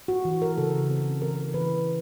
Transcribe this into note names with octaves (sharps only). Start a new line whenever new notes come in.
F#4
E3
A#4
C#3 A4
C4
E3 A#4
E3 B4